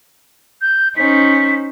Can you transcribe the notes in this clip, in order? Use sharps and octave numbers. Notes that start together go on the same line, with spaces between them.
G6
C#4 D#4 C5 B6